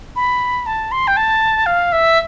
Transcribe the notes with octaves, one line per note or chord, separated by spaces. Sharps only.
B5
A5
C6
G5
A5
F5
E5